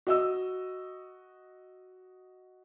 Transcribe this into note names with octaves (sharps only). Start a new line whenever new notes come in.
F#4 D#5 E6